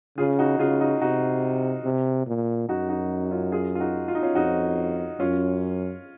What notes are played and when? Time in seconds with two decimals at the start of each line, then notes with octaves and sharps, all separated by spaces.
0.18 C#3 F4 G#4
0.39 D#4 F#4
0.59 C#3 F4 G#4
0.80 D#4 F#4
1.01 C3 D#4 F#4
1.84 C3
2.27 A#2
2.68 F#2 D#4 F#4
2.89 D#4 F#4
3.31 C#4 F4
3.52 F4 G#4
3.75 F4
3.80 D#4 F#4
4.08 F4
4.15 D#4
4.23 C#4 F4
4.35 F2 D#4 F#4
5.20 F#2 C#4 F4